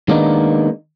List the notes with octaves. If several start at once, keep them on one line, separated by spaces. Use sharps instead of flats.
D#3 G#3 A#3 B3 D4 D#4